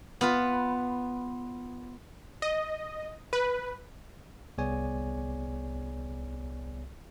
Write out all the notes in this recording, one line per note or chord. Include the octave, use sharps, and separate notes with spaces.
B3 F4 B4
D#5
B4
C2 B3 G#4 C#5 D5 G#5